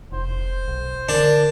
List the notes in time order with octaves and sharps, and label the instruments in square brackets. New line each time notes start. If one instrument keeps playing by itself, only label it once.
[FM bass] F1 [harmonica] C5
[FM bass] B1
[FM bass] D3 [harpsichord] D4 [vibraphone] A#4